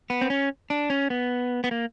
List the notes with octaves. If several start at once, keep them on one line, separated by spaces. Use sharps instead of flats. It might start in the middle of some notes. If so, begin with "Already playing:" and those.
B3
C4
C#4
D4
C#4
B3
B3
A#3